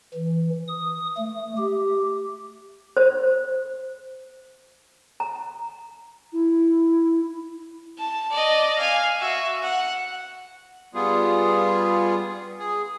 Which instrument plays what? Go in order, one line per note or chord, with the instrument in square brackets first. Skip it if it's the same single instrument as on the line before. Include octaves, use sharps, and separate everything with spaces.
[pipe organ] E3
D#6
A3
G4
[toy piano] C5
A#5
[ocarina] E4
[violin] A5
D5 D#5
F5 G#5
F#4 E5
F#5
[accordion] G3 B3 F4 G#4
G#4